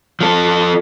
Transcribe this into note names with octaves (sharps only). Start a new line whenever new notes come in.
F3 A4